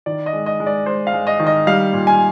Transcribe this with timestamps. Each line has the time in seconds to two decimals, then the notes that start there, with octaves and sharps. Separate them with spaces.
0.06 D#3 D5
0.26 D#5
0.33 G#3
0.46 D#5
0.60 G#3
0.67 D5
0.86 G#3 C5
1.07 F5
1.13 G#3
1.27 D#5
1.40 D#3
1.47 D#5
1.67 G3 F5
1.93 A#2
2.07 G#5